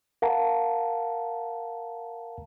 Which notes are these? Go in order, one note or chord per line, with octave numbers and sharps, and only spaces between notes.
A#4 F5 F#5 A5 A#5